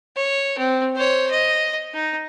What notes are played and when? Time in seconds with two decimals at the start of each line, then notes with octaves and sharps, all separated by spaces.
0.16 C#5
0.58 C4
0.95 C5 C#5
1.31 D#5
1.94 D#4